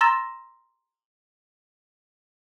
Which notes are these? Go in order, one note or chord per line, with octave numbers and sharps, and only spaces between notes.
A#5 C6 E6 A6 A#6 E7